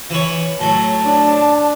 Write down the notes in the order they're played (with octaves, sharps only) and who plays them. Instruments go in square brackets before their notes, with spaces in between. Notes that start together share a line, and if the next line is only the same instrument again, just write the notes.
[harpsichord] E3 B4 C#5
[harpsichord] A2 F#3 [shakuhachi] A5
[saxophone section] D4